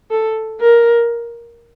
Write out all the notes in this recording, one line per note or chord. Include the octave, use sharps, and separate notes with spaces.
A4
A#4